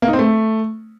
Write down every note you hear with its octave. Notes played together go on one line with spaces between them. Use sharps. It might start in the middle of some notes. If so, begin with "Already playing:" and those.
A#3
D#4
C4
A3